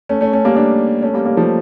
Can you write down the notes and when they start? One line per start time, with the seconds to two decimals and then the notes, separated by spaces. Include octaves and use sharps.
0.09 A3 C#4
0.21 A3 C#4
0.33 A3 C#4
0.45 G3 A#3
0.56 A#3 D4
1.02 A3 C#4
1.14 G3 A#3
1.25 G3 A#3
1.37 F3 A3